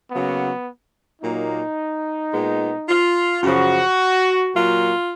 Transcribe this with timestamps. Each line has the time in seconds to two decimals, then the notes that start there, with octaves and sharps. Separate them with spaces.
0.11 C#3 F#3 A#3 B3
1.22 A#2 F#3 A#3 D#4
2.32 A#2 G#3 B3
2.88 F4
3.43 F#2 C#3 F3 F#4
4.54 A#2 F#3 A#3 F4